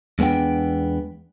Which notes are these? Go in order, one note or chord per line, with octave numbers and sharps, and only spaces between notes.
E2 G#3 B3 D4 G5